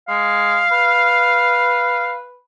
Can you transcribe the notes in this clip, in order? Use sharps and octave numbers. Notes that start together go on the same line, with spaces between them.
G#3 F5
B4